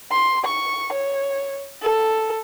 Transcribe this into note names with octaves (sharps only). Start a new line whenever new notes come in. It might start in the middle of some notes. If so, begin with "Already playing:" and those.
C6
C#6
C#5
A4